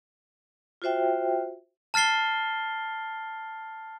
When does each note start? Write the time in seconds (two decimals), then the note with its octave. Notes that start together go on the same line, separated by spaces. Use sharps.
0.82 F4 F#4 C5 E5 G5
1.94 A5 F6 A6 C7 G7